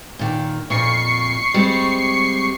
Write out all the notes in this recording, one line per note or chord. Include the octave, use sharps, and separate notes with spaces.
A#2 D#3
F2 A#2 C#6 C7 C#7
G3 G#3 C4